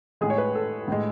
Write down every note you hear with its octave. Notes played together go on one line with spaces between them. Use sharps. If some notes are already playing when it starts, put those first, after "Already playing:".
A2 G#3 G#4
C#5
B4
A4
A2 G#3